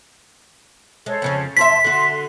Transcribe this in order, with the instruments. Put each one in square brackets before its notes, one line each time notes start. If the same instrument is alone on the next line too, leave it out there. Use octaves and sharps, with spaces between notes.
[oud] G#3 [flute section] A4 C5 C#5
[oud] F2 C#3 C#4
[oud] F#2 F#4 E5 [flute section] C5 A5 C6 [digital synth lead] B6
[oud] D3 F#4 [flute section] C6